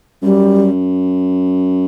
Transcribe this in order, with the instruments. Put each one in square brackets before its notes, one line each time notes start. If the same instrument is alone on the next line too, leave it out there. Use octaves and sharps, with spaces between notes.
[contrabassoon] F#2 [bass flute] G3